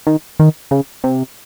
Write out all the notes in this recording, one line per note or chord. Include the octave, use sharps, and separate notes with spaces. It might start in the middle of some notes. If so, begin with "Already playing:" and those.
D#3
D#3
C#3
C3